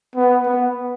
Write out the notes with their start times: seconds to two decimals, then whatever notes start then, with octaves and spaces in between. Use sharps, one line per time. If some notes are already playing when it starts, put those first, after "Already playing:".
0.16 B3
0.46 B3